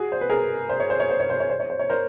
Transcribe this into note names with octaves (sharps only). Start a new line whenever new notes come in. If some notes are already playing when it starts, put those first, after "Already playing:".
Already playing: F#4 G#4
C5
B4
G#4 A#4
C5
C#5
C5
C#5
C5
C#5
C5
C#5
C5
C#5
C5
C#5
A#4 C5